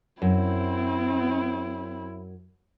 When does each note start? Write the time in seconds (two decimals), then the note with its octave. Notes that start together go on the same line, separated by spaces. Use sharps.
0.22 F#2 C4 E4